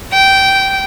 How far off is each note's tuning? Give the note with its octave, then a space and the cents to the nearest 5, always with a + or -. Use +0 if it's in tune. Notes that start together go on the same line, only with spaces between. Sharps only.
G5 -15